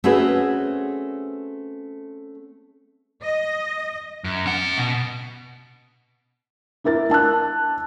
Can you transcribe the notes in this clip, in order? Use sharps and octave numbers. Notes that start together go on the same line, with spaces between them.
A3 C4 C#4 F#4 G#4 B4
D#5
F#2
C#4 F#5
B2
D4 E4 A#4 A6
D4 A5 E6 F#6